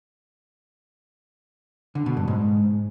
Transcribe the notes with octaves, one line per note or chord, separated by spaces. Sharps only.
D3
B2
G2
G#2